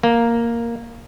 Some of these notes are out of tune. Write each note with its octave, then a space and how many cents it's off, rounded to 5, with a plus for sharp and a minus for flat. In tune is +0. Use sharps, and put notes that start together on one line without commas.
A#3 +0